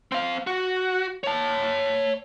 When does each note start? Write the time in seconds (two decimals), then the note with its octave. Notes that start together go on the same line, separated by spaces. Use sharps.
0.12 C4 F5
0.47 F#4
1.24 C#5 A5